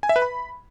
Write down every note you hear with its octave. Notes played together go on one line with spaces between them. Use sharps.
G#5
E5
B4
B5